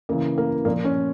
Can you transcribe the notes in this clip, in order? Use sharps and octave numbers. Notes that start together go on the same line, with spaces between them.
C#3 E3 A#3
A#3
A#2 F3 A#3
C#4